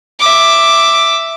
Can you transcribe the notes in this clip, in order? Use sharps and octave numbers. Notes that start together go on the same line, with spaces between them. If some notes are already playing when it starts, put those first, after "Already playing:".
E5 D6